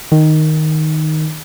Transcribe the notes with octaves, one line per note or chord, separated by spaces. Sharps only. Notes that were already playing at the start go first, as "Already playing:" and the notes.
D#3